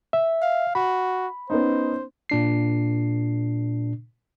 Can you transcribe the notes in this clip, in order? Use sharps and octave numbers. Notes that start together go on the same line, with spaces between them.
E5
F5
F#4 B5
B3 C#4 D#4 C5
A#2 D4 C7